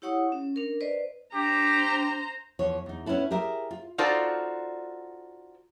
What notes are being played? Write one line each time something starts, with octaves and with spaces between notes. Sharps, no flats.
E4 G4 C#5 F#5 C#6 D#6
C#4
D4 A#4
B4 C5 D5 D#5
D4 G4 C5 A#5
E2 F3 C#5
E2 D#4
B3 C#4 D4 E4 A4
G4 G#4 A#4 E5
F4
D#4 F4 F#4 A4 C5 D5